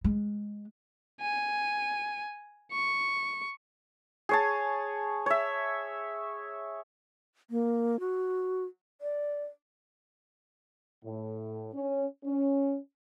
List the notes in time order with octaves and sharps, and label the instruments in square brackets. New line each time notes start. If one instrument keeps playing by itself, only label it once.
[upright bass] G#3
[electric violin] G#5
C#6
[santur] G#4 C#5 A5
C#5 E5
[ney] A#3
F#4
D5
[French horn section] A2
C#4
C#4